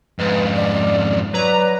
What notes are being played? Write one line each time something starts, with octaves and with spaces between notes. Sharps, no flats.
F2 G#2 B4
D5
F#3 B4 D5 A#5